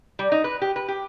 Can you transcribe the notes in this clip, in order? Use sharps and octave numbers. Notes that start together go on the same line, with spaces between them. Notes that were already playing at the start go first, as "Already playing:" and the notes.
G3
D#4
B4
G4
B4
G4